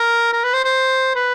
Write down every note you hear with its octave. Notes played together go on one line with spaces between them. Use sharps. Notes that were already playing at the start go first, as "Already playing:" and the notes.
Already playing: A#4
A#4
B4
C5
C5
B4